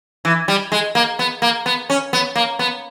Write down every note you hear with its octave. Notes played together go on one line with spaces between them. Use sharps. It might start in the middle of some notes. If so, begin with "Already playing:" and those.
E3
G3
G#3
A#3
B3
A#3
B3
C#4
B3
A#3
B3